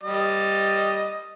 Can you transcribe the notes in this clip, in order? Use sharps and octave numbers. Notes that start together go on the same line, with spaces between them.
G3 D#5